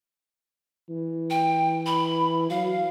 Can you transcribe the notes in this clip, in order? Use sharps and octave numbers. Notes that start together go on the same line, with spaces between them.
E3
G5
B5
F#3 F5